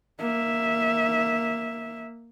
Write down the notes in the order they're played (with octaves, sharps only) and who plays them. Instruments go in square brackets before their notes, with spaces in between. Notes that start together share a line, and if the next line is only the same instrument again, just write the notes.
[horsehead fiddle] A#3 E5